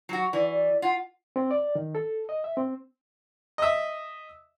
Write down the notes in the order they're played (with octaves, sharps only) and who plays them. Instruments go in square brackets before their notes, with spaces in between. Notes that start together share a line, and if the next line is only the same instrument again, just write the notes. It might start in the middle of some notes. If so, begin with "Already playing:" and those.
[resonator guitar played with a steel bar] F#3 F#4
[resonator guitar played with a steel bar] E3 [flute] D5
[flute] D5
[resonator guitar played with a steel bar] F4 [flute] F#5
[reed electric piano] C4
D5
D#3
A4
D#5
E5
C4
[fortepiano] D#5 E5